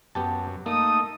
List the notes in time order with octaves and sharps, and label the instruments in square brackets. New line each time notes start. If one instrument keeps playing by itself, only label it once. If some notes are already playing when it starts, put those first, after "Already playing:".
[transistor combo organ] F#2 [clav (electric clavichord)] B3 G4 A5
[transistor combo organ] A3 D#4 [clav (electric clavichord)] A#3 [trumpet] D#6